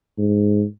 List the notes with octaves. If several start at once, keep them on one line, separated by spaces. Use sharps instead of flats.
G#2